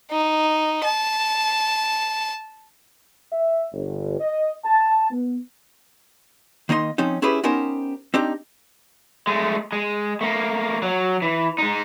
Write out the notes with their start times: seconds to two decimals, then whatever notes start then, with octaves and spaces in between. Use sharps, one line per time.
0.11 D#4
0.84 A5
3.32 E5
3.72 G1
4.19 D#5
4.65 A5
5.11 B3
6.69 D#3 A#3 D#4 D#5 C6
6.98 F3 C4 C#4 D#4
7.22 C#4 E4 G4 G#4 B4
7.43 B3 C#4 D#4 G4 A#4 C5
8.14 C4 D4 D#4 G4
9.27 G#3 A3
9.72 G#3
10.21 A3 A#3
10.82 F#3
11.22 E3
11.58 G#3 D#4